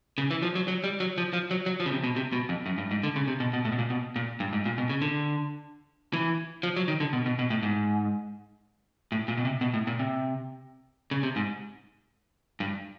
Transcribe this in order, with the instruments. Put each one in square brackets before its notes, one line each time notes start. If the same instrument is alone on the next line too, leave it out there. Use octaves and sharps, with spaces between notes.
[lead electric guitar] C#3
E3
F3
F#3
F#3
G3
F#3
F3
F3
F#3
F#3
F3
C#3
C3
B2
C3
B2
F2
F#2
G2
G#2
D3
C#3
C3
B2
B2
A2
B2
A#2
B2
A#2
G2
G#2
A#2
B2
C#3
D3
E3
F3
F#3
D#3
D3
B2
B2
B2
A2
G#2
A2
A#2
B2
C3
B2
A2
A#2
C3
C#3
C3
G#2
G2